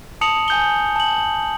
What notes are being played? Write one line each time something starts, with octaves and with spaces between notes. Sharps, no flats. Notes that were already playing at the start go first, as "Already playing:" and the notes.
A5 D#6 C#7 F7 F#7
G#5 G6 G7
A5 F#7